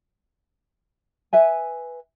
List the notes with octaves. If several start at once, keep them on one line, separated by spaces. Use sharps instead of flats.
B4 E5 G#5